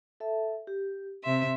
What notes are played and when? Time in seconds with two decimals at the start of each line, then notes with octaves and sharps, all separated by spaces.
0.20 A4 E5 A5
0.67 G4
1.24 C3 E5 C6